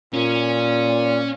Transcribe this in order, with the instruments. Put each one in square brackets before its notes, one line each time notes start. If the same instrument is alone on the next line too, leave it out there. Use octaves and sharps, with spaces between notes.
[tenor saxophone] A#2 [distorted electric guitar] C#4